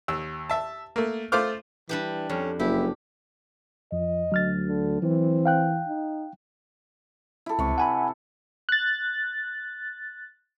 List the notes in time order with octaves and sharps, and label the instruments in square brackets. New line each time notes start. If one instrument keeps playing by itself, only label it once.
[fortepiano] D#2 E6
E5 A5
A3 A#3
A3 F4 C5 D6 F6
[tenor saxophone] E3 [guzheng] G3 D4 G4
[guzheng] F2 [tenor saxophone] C#4
[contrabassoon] F#1 [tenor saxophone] E4 [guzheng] G4
[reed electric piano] F2 [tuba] F3 [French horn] D#5
[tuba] D2 [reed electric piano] F#3 F6 A6
[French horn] D3
[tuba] E3 [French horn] C4
[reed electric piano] F5 G5 F#6
[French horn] D#4
[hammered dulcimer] E4 A4
[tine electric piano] C#2 [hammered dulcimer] C3 C#6
[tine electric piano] F#5 G#5 B5
[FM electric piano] F#6 A6